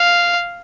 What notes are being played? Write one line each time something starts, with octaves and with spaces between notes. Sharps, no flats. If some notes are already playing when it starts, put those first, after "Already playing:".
Already playing: F5